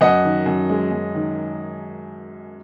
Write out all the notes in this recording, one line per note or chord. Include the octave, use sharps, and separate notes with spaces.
F#2 D#5 F#5
D#3
F#2
G#3
F#2
D#3